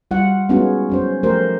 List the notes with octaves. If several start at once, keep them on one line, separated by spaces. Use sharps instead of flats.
G3 F4 F#5
G#3 B3 C#4 D#4 F4 F#4
F#3 C#4 C5
F3 A3 G4 A#4 C5